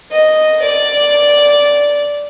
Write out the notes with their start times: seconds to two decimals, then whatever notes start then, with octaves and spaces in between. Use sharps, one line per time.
0.12 D#5
0.63 D5